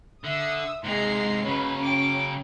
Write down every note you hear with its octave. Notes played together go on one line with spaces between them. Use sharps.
D3 E5 D#6 E6
G#2 C3 G#3 A#5 C6 C7
C#3 F#3 C#4 B4
G5 D6